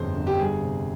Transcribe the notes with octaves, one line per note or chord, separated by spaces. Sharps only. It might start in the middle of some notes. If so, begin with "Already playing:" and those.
Already playing: G1 F2 C#3 C5
G1
G4
G3 G#4
C3